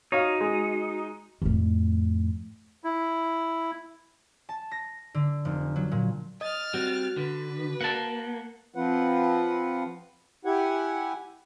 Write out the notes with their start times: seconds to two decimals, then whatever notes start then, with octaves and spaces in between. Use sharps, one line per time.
0.12 D#4 F#4 C#5 F5
0.41 G#3
1.42 F2 A2
2.84 E4
4.49 A5
4.71 A#6
5.14 D3
5.45 F1
5.76 F#3
5.91 A#2
6.41 D#5 F6 A6
6.74 G3 C4 F#4
7.17 D3 B4
7.81 A#3 F#5 A5
8.75 F3 C4 F4 B4 F#5
10.45 E4 G4 F#5 G#5